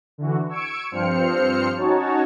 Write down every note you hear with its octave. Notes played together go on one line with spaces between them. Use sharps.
D3 E3 F#4
C#6 E6 G#6 C#7 D7
G2 F3 C4 C5 F6 C#7
C#4 D#4 F#4 C#5 A5